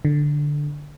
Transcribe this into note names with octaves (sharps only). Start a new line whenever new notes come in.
D3